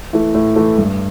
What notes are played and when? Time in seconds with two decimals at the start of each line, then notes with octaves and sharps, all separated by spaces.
0.13 E3 A3
0.35 A2
0.56 E3 A3
0.78 G2